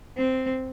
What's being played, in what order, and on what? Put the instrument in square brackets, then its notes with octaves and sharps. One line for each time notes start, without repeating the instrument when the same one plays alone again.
[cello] C4